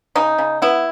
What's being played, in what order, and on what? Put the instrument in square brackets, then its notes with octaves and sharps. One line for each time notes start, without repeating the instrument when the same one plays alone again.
[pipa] C#3 D#4
C#3
B3 E4